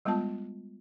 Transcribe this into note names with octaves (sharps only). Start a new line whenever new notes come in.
G3 G#3 B3 F4 A5